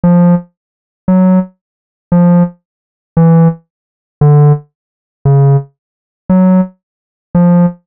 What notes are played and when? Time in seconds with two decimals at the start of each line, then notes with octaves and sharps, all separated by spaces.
0.04 F3
1.08 F#3
2.12 F3
3.17 E3
4.21 D3
5.25 C#3
6.29 F#3
7.35 F3